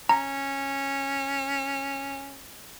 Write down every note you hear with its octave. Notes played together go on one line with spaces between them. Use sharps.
C#4 A#5